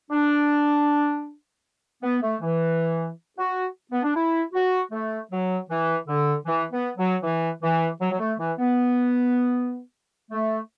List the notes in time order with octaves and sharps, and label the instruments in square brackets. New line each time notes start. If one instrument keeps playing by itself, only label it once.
[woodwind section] D4
B3
A3
E3
F#4
B3
D4
E4
F#4
A3
F#3
E3
D3
E3
B3
F#3
E3
E3
F#3
F#3
A3
E3
B3
A3